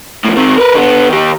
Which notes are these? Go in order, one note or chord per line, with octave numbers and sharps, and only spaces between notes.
A2 F3
D#3 C4
A#4 B4
D3 B3
D#3 G4